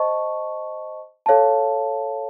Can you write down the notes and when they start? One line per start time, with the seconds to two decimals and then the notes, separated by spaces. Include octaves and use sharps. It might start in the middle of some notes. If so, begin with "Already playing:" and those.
Already playing: C5 D#5 A5 C#6
1.26 A4 C#5 F5 A5